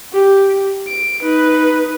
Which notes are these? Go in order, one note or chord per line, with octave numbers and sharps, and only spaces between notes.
G4
D7
D#4 B4